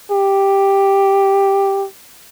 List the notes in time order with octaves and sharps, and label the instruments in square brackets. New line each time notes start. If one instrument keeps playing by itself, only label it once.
[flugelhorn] G4